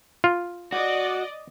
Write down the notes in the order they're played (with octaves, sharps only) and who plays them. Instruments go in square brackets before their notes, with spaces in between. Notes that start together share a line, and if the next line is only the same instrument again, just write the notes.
[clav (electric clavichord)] F4
[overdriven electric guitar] F#4 [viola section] D5 D#5